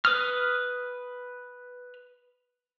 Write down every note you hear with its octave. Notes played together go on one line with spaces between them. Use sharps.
B4 D#6 F6